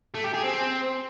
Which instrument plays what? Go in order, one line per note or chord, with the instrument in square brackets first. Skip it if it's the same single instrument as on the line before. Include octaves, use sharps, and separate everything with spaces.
[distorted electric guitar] A3
G4
G#4
C4